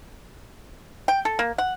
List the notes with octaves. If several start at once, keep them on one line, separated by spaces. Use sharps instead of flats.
G5
A4
A#3
F#5